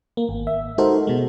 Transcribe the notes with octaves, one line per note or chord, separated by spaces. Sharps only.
A#3
G#1
E5
G#3 D#4 F#4 A4 A#4 C5
B2 G#3